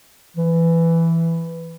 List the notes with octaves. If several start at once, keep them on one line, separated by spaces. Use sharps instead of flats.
E3